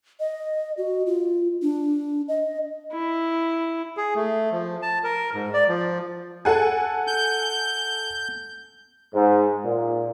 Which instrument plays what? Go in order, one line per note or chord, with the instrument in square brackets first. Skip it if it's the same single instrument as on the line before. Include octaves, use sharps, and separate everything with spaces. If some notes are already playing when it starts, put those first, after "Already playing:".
[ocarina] D#5
F#4
F4
D4
D#5
[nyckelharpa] E4
[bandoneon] G#4
A3
F3
A5
A#4
G#2
D5
F3
[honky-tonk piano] A4 F#5 G#5
[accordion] G6
[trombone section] G#2
A#2